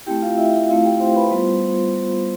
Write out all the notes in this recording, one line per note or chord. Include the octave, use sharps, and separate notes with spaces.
A3 C4 E4 G4 G5
F4 F5
E4 E5
E4 E5
A3 C4 E4 F4 F5
G4 G5
C5 C6
B4 B5
G3 B3 F4 C5 C6